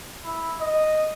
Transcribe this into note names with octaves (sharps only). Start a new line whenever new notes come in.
E4
D#5